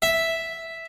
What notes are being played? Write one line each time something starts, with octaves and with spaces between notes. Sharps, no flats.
E5